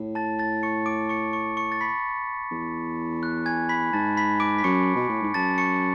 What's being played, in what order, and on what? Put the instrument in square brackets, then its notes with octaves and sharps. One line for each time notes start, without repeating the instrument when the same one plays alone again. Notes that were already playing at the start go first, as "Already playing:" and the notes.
Already playing: [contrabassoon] A2
[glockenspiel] A5 A6
A5 A6
C#6 C#7
D6 D7
C#6 C#7
C#6 C#7
C#6 C#7
A6
B5 B6
[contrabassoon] E2
[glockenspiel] F#6
G#5 G#6
B5 B6
[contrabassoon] G#2 [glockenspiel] A5 A6
[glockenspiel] B5 B6
D6 D7
B6
[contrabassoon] F#2 [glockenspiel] C#6 C#7
[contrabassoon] B2
A2
G#2
[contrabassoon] F#2 [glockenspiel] A5 A6
[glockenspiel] C#6 C#7